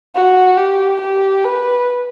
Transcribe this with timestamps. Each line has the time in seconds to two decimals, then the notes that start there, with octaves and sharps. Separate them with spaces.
0.15 F#4
0.57 G4
1.01 G4
1.44 B4